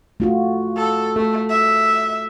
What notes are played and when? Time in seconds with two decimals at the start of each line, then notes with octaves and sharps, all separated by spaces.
0.20 A3 F4 F#4
0.77 A4
1.16 A3 A4
1.50 E5